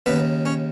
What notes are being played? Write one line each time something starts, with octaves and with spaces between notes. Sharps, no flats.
D#2 C#3 B3 B4
C#4 C#5